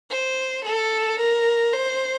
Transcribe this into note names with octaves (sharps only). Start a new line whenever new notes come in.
C5
A4
A#4
C5